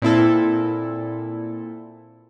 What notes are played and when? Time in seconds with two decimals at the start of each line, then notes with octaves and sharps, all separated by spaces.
0.02 A#2 C4 E4 A4